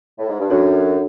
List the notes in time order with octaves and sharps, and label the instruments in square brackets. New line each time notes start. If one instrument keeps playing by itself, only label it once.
[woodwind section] A2
G#2
G2
[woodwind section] F#2 [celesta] D4 F#4 A4 C#5